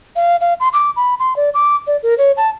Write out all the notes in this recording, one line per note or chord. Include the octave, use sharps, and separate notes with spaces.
F5
F5
C6
D6
B5
C6
D5
D6
D5
A#4
C#5
A5